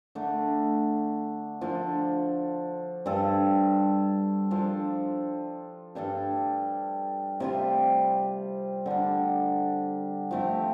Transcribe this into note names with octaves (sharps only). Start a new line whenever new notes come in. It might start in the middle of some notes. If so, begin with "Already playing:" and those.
D3 A3 D4
F3 D4 F4 A4
G2 G3 F4 A4
F3 D4 F4 A4
G2 G3 D4 A4
C3 G3 F4
D3 G3 D4
F3 A3 C4 G4